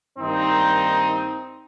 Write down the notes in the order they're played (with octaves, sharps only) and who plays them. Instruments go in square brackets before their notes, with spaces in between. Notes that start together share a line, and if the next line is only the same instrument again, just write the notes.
[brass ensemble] G2 D#3 G3 A#3 C4 D#4